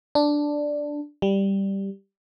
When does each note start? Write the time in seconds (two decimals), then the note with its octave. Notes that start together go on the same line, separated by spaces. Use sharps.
0.15 D4
1.22 G3